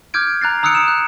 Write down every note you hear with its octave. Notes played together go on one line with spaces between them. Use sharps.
D6 F6 G6 G#6 D7
A#5 F#6 A6 C7
A#5 D#6 E6 F#6 C#7 D7
C#7 E7
F#6